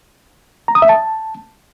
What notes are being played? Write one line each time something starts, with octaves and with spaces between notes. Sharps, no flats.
A#5
D#6
E5
A5